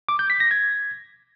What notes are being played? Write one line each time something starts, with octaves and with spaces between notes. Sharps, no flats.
D6
G6
B6
A#6
G#6